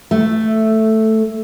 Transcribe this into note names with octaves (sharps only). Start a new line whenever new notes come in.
A3